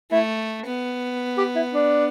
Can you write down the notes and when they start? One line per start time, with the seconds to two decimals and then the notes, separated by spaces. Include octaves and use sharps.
0.11 A3 E4
0.66 B3
1.38 G4
1.55 E4
1.73 D4